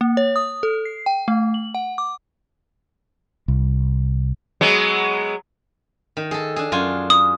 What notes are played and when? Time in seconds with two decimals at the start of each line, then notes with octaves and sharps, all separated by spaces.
0.01 A#3
0.17 C#5
0.36 D#6
0.63 A4
0.85 C7
1.06 G5
1.28 A3
1.54 F#7
1.74 F#5
1.98 D6
3.48 C2
4.61 F#3 G#3 B3
6.17 D#3
6.31 G#4 A4
6.56 D4 G#4
6.72 F#2 F4 G#5
7.10 D#6